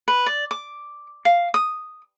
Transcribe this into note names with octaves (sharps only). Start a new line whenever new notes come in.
B4
D5
D6
F5
D#6